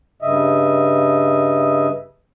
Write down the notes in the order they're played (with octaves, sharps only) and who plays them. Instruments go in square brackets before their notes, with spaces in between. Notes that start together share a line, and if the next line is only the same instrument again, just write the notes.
[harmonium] G2 C#3 D#5 E5